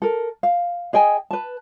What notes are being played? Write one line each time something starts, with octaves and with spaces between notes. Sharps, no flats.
A4 A#4
F5
G#4 D#5 G5 G#5
B4 A5